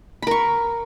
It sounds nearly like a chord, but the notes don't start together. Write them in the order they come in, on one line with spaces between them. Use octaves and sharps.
B5 A#4 C#6